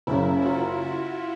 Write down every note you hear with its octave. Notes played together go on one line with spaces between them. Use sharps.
F#1 F#2 C#3 E4
F#4
F4
F#4